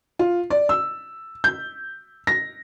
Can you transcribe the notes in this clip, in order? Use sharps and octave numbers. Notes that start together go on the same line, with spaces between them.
F4
D5
E6
G6
A#6